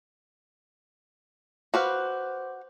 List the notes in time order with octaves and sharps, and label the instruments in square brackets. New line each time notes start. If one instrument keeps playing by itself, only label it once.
[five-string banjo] F#4 B4 F5 [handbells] C5 D6